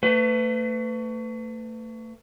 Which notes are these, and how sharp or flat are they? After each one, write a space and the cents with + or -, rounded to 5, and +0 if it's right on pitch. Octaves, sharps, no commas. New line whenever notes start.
A3 +35 B4 +30